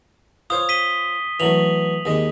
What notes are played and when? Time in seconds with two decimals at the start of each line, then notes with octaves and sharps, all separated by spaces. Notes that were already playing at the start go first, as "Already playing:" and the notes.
0.50 F4 C5 C#5 D#6
0.69 B6 D#7 G7
1.40 E3 F#3 A3 F7 F#7
2.05 D#2 G#3 D#5